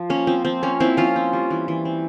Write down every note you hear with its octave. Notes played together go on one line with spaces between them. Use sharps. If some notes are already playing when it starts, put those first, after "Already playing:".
Already playing: F3
A#3 C#4
F3 C4
F3 C4
A#3 C#4
A#3 C4 E4
F3 C#4 F4
C4
G3
E3
E3
C4